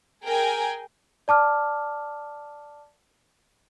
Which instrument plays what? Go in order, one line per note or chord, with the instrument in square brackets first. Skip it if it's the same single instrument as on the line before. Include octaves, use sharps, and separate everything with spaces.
[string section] G#4 A#4 G5 G#5
[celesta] D5 A5 D6 F6